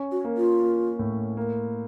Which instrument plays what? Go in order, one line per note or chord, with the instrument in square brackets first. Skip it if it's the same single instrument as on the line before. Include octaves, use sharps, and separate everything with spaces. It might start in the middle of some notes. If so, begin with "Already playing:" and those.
Already playing: [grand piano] C#4
[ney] F#4
[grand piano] A#3
[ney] F4
[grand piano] A#3
A2
A#3